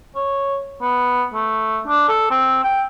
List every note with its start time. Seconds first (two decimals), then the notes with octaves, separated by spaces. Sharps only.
0.15 C#5
0.82 B3
1.34 A3
1.88 D4
2.09 A4
2.30 C4
2.63 G5